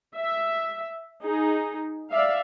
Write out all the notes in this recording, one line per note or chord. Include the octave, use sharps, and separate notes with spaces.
E5
D#4 G#4
D5 E5 F5